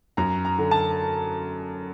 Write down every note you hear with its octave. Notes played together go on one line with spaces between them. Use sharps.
F#2 A#5
A#5
D3
A5